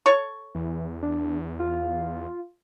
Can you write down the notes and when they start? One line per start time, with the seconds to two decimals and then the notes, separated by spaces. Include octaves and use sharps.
0.06 A4 C#5 C#6
0.55 E2 E3
1.02 D4
1.59 F4